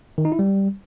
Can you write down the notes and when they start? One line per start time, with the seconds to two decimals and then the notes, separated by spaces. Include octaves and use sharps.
0.18 D#3
0.25 D#4
0.32 E4
0.39 G3